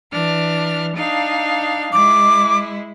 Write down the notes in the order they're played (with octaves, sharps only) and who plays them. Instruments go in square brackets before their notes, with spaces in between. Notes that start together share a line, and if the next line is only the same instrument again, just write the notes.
[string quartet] E3 D4 F6
D4 D#4 F5
[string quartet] G#3 E4 [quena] D6